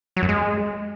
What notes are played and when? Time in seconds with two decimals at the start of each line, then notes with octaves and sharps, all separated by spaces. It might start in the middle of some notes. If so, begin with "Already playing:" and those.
0.16 F#3
0.23 F#2
0.29 G#3